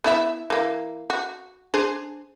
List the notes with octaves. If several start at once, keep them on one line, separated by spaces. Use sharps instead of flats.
B3 E4 E5
E3 A#3
F#4
D4 G#4 C5